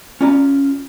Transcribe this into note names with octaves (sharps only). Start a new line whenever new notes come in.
C#4 F4 D5 A#5